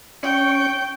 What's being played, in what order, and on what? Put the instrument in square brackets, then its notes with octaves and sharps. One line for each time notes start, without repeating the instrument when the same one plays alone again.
[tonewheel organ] C#4 C#6 [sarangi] G5